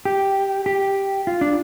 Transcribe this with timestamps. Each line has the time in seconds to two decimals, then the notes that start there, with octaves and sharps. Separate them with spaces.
0.05 G4
0.66 G4
1.27 F4
1.41 D4